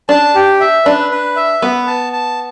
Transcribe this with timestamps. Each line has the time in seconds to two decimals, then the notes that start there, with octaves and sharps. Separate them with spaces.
0.09 D4 A5
0.35 G4
0.60 E5
0.85 D4 B4
1.11 B4
1.36 E5
1.62 B3 B4
1.87 A5
2.13 A5